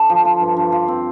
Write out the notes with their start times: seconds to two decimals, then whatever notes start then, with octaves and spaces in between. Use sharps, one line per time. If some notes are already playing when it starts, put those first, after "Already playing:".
Already playing: D3 D4
0.10 F3
0.25 F4
0.41 G2
0.57 G2
0.72 F4
0.88 C4